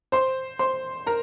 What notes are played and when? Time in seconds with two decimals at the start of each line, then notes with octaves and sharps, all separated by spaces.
0.12 C5 C6
0.59 C5 C6
1.07 A#4 A#5